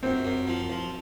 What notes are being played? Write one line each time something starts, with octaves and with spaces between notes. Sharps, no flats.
F#2 C4
F#2
F3
F3